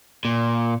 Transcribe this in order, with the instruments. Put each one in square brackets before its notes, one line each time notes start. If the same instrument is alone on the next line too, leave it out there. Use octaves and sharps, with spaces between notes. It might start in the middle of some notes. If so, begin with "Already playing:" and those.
[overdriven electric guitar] A#2